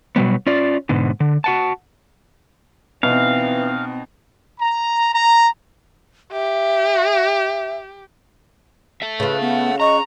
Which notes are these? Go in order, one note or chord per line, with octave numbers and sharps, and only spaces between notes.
B2 F#3 G3 B3
C#4 F4 D5
G#2 B2 D3
D3
F#4 F#5 A5
B2 E3 C4 D#4 F5
A#5
A#5
G4 E5
A4 E5
C#3 F4 B4
B3 F#5
D#5 A#5 C#6